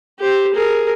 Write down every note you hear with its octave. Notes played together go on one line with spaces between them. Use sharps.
G4 C5
G#4 A#4